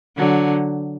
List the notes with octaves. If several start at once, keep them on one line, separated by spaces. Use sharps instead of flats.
D3 F#3